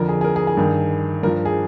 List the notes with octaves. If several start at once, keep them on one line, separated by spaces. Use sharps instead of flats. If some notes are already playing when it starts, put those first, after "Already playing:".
Already playing: F2 D3 F3 A#4
G#4
G#4
A#4
G#4
G#4
G2 D#3
G2 F3 A#4
G#4